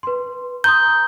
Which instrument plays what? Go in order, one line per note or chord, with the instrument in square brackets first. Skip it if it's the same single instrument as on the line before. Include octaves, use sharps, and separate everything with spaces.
[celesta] B4 C6
[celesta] A#5 C6 D#6 [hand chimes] G6